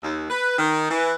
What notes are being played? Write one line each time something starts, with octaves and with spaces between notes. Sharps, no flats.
D#2
B4
D#3
E3